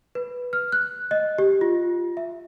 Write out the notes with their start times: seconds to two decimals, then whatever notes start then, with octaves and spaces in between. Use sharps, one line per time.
0.15 B4
0.53 F6
0.72 F#6
1.11 D#5
1.38 G4
1.61 F4
2.17 E5